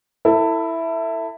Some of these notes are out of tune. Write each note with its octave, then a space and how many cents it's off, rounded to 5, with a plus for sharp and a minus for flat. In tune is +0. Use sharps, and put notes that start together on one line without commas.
E4 +0 A4 +30